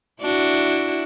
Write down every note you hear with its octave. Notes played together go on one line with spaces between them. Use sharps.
D4 E4 F#4